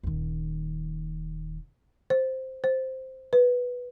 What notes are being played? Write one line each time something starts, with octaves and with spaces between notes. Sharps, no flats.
D#1 D#3
C5
C5
B4